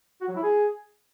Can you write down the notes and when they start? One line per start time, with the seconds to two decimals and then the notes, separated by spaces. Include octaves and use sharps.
0.21 F#4
0.28 F#3
0.36 E4
0.43 G#4